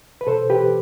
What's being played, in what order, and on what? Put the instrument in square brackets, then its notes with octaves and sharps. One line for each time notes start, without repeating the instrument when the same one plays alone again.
[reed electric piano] B4
B2 A4 C5
G4 B4